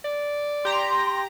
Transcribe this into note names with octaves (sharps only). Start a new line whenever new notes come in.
D5
G4 A#5 C6